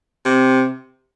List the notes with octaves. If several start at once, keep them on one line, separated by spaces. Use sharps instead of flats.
C3